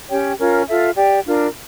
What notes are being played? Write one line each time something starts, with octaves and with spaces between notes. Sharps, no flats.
C#4 G4 C#5 G5
C#4 F4 A#4 C#5
F4 A4 E5
G4 D5 G5
D4 F4 A#4